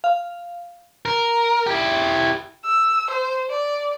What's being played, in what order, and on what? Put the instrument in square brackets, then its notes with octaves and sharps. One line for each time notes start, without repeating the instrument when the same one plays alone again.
[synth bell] F5
[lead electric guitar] A#4
E4 G4
[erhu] E6
C5
D5